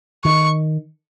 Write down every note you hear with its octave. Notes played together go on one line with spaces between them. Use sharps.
D#3 C#6